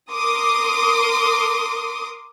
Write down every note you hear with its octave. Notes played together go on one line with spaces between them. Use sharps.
A#4 C6 D6 D#6